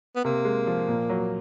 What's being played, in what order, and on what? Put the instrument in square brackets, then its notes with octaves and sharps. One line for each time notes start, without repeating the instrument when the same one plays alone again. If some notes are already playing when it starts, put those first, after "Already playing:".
[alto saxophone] B3
[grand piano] C3 [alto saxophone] A#3
[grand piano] G#3
F3
A#2
F#3